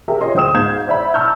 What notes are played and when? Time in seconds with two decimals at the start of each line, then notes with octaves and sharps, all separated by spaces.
0.08 G4 G#4 A#4 E5
0.21 F4 G#4 C#5 D#5 C6
0.34 D2 C5 G5 D#6 E7
0.54 G#2 F5 G6 G#6 E7
0.87 C5 D5 E5 F#5 B5
1.14 A5 A#5 C#6 E6 F6 G6